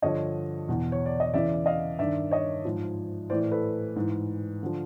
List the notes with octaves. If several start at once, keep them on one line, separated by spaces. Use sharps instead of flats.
G2 D3 F3 C#5 D#5
E2 B2
C#5
D5
D#5
E2 C#3 E3 D5 E5
D#5 F5
G2 D#3 D5 E5
C#5 D#5
G#2 F3
A2 E3 C5 D5
A4 B4
G#2 E3
D3 F3